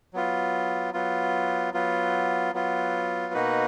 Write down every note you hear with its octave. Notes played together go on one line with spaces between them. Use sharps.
F#3 B3 F4
F#3 B3 F4
F#3 B3 F4
F#3 B3 F4
B2 A#3 D#4 F#4 B4